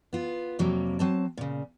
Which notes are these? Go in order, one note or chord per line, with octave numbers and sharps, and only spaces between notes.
B3 F4
F2 C3 F#3 G3 A#3
F#3 C4 A5
A#2 C#3